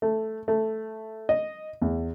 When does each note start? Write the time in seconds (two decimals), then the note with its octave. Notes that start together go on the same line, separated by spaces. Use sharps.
0.02 A3
0.48 A3
1.29 D#5
1.82 E2